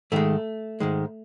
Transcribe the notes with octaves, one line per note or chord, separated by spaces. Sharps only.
G#2 D#3 G#3 A3
G#2 D#3 G#3